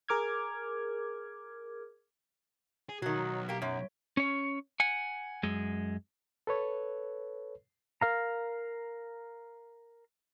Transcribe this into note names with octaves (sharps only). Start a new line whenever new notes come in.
G#4 A#4 D6 F6 G#6
G#4
B1 D#3 F#3 F#4
A#3 G4 B6 D7
F#2 C#5
C#4 C#5
F#5 G#5
F#2 G#3
A4 B4 C#5
A#4 F5 A#5